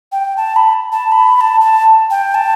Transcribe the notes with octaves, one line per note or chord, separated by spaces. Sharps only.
G5
A5
B5
A5
B5
B5
A5
A5
G5
A5